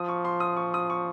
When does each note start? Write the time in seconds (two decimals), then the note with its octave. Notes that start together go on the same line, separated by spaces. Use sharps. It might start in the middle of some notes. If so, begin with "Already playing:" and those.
Already playing: F3 D#6
0.09 C#6
0.25 C6
0.40 D#6
0.57 C#6
0.74 D#6
0.90 C#6